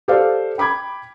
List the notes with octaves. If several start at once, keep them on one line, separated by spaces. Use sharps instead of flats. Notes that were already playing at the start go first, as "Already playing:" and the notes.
G4 A4 C5 D5 F5
G5 B5 D6 G#6